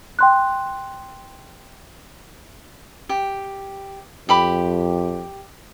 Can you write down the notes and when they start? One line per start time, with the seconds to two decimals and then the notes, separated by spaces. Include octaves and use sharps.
0.19 G5 C6 F#6
3.09 G4
4.29 F2 G4 B5 D6